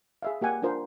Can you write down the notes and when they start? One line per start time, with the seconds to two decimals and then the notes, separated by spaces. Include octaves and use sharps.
0.22 G#4 E5 F5
0.41 A#3 G4 F#5 G#5
0.62 D4 F4 A#4 C5